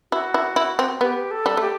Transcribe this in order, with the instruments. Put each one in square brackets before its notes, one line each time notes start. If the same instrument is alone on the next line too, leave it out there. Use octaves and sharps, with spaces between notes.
[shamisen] E4 [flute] F#4
[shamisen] E4
E4
C4
[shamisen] B3 [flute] G4
[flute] A4
[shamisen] G3
[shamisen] A3 [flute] G4